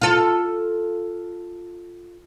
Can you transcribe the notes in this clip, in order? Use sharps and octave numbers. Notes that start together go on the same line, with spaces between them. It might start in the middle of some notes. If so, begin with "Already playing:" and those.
F4 A4